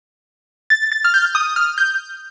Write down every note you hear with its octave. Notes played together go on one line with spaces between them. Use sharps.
A6
A6
F6
G6
D#6
F6
G6